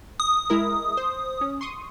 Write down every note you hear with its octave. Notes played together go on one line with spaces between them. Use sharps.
D#6
G#3 E4 A#4
C5
C#4
C6 C#6 D#6